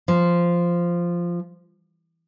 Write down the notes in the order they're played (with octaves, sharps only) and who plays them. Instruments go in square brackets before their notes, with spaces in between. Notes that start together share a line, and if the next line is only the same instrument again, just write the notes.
[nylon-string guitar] F3